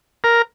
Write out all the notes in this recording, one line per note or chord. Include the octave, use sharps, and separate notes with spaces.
A#4